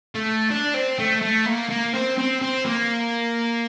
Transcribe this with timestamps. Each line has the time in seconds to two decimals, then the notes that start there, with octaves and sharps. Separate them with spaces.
0.15 A3
0.51 D4
0.74 C4
0.99 A3
1.22 A3
1.46 A#3
1.70 A#3
1.94 C4
2.18 C4
2.42 C4
2.65 A#3